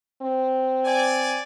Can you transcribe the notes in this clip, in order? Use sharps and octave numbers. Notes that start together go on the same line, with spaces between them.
C4
D5 G#5